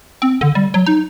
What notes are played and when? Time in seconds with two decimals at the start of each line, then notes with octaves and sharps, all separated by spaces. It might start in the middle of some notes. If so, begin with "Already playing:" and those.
0.22 C4
0.41 D3
0.55 G3
0.74 F#3
0.86 D#4